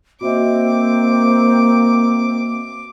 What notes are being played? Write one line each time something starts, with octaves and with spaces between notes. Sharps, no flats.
A#3 C4 F#4 D#5 E5 D6